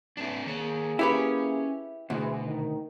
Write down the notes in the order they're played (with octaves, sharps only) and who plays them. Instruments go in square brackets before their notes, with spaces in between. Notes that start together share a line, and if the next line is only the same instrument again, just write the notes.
[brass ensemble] B1 G#2 E3 [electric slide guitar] C4 D4
[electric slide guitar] D#3 C#5 [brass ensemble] A#3 G#4
[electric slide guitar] C#4 [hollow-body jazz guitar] E4 G4 B4
[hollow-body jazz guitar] D2 [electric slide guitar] B2 [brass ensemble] E3 G#3
[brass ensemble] D#3